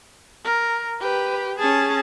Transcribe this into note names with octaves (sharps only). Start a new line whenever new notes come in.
A#4
G4 B4
C#4 G#4 A5